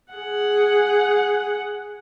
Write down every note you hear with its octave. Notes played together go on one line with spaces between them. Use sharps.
G#4 F#5